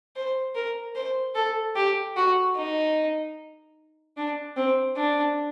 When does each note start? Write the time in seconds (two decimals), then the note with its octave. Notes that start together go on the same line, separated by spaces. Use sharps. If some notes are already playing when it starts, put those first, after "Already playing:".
0.16 C5
0.55 A#4
0.96 C5
1.35 A4
1.76 G4
2.17 F#4
2.57 D#4
4.17 D4
4.57 C4
4.97 D4